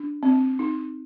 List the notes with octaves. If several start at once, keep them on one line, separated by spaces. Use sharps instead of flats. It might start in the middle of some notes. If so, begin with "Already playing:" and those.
Already playing: D4
C4
D#4